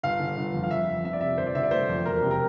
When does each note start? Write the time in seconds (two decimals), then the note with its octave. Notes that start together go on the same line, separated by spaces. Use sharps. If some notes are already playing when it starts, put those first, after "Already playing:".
0.03 G1 F5
0.20 D3
0.37 G1
0.54 F2
0.63 F5
0.70 F2 E5
0.88 F3
1.04 C4 E5
1.13 D5
1.21 C3 E5
1.38 G1 C5
1.47 D5
1.55 D3 E5
1.63 D5
1.71 A3 C5
1.89 F2
2.05 E1 A#4
2.22 C3
2.31 A#4